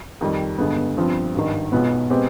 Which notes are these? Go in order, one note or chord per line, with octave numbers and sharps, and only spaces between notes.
F2 D#3 G3
G1 G2 D3 G#3 B3
G2 F3 C4 F4
G#1 G2 D#3
B1 B2 G#3 B3 F4
B2 G#3 C4 G4 B4